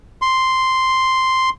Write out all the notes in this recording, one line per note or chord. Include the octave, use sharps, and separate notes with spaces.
C6